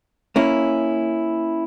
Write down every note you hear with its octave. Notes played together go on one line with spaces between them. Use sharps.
A#3 C#4 E4